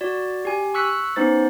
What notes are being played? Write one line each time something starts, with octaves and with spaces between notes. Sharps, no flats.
F#4 D5
G4 G#5
C#6 E6 F#6 B6 C#7
B3 C#4 D#4 C5 A6